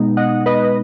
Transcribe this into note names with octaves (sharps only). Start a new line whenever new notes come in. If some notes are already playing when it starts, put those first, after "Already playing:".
Already playing: B2 G#3 B3 D#4
D#5 F#5
B4 D#5